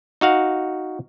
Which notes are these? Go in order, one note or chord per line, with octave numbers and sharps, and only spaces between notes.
D#4 F#4 F5 F#5